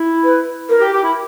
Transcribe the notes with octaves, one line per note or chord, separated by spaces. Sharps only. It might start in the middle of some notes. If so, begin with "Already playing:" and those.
Already playing: E4
B4
A#4
G4
G4
E4